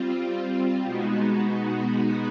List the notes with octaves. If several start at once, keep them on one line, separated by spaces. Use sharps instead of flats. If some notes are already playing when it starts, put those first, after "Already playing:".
Already playing: G3 C4 F4
B2 G#3 B3 D#4 F#4